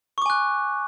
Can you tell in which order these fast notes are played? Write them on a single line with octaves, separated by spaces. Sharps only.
C#6 D6 G#5 F#6